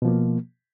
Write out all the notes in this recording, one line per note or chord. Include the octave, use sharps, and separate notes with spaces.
B2 F3 A#3